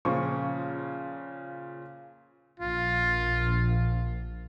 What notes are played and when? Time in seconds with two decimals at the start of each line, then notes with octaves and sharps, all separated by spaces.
0.05 A#2 C#3 F3 C5 C#6
2.60 A#1 F4